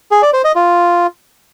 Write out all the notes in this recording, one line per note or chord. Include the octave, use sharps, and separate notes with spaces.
G#4
D5
C5
D#5
F4